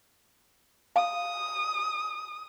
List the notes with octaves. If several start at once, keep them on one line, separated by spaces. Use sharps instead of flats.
F5 D#6